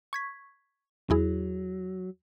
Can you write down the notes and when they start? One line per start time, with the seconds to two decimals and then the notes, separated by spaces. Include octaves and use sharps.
0.13 C#6 G#6 B6
1.10 E2 F#3 E4 G#4